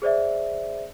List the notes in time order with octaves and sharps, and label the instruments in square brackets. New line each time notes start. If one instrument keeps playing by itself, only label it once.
[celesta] G#4 C5 D5 E5